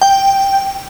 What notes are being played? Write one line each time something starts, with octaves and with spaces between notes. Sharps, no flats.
G5